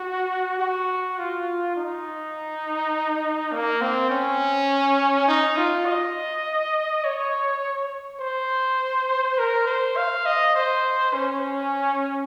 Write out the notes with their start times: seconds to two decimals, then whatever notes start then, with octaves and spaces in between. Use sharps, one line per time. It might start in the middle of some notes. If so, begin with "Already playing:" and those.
Already playing: F#4
0.59 F#4
1.18 F4
1.76 D#4
3.52 A#3
3.81 C4
4.11 C#4
5.28 D#4
5.57 F4
5.86 D#5
7.04 C#5
8.20 C5
9.38 A#4
9.67 C5
9.97 F5
10.26 D#5
10.56 C5
11.14 C#4